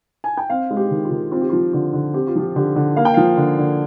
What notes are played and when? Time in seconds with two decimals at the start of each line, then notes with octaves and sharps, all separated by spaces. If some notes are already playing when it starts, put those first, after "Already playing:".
0.24 G#5
0.37 G5
0.50 C4 F5
0.70 G#3
0.77 G4
0.91 D#3
1.05 F4
1.11 D#3
1.31 C4 F4
1.41 G4
1.50 F3 F4
1.73 D3 F4
1.93 D3
2.14 C4 G4
2.27 F4
2.35 F3 G4
2.56 D3 G4
2.76 D3
2.96 A#3 F5
3.05 G5
3.14 F3 F5
3.37 D3
3.58 D3